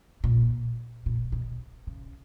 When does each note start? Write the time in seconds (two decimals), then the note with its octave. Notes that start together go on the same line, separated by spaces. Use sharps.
0.24 A#2
1.06 A#2
1.32 B2
1.87 C#3